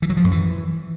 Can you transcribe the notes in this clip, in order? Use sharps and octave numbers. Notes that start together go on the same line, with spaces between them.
E3
F#3
F3
F#2
E3